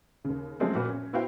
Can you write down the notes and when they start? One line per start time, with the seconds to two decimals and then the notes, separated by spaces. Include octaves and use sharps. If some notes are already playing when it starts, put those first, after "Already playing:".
0.24 D#2 C#3
0.60 F3 F#3 G#3 A3 C4 C#4
0.75 A#2 F#4 B4
0.89 C#4
1.13 B3 E4 F#4 C5 F5 G5